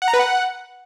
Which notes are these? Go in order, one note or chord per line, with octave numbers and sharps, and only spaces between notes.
F#5
A#5
B4
F#5